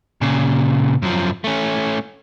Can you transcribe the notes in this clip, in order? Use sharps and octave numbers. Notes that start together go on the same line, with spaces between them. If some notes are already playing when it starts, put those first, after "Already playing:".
A#2 C#3
F#2 F3
A3 C#4